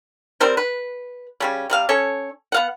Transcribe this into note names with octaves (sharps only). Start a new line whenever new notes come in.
G3 C4 A#4 C5
B4
C#3 G3 C#4
C3 G3 F5
C#4 A4 C#5
B3 F5 F#5